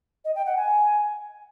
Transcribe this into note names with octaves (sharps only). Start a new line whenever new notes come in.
D#5
G5
F#5
G#5